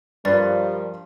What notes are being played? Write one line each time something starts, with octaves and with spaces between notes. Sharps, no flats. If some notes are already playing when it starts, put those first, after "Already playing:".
G2 F3 G3 A#4 B4 D5 C6 A6